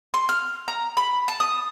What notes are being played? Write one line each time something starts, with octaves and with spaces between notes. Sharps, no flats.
C6
F6
A#5
B5
A5
D#6